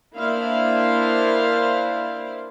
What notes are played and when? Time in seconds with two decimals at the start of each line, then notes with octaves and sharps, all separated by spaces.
0.15 A#3 D4 E4 C5 F5